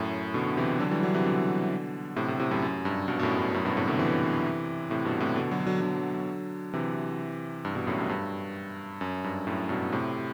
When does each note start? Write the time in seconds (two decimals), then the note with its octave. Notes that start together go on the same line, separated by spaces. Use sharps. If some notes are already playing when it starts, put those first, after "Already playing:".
Already playing: F#2 A2
0.34 B2 D3
0.57 C3 E3
0.79 D3 F#3
0.91 E3 G3
1.03 D3 F#3
1.14 C3 E3
1.26 B2 D3
2.16 A2 C3
2.28 A2 C3
2.39 A2 C3
2.51 F#2 A2
2.62 F#2
2.85 G2
3.08 G2 B2
3.19 B2
3.23 F#2 A2
3.38 G2
3.54 F#2 A2
3.65 G2 B2
3.77 A2 C3
3.88 B2 D3
3.99 C3 E3
4.90 A2 C3
5.05 G2 B2
5.20 A2 C3
5.36 B2 D3
5.51 D3 F#3
5.66 D3 F#3
5.81 D3 F#3
6.73 C3 E3
7.65 G2
7.75 G2 B2
7.87 F#2 A2
7.99 G2
8.09 G2
9.01 F#2
9.24 G2
9.47 F#2 A2
9.69 G2 B2
9.92 A2 C3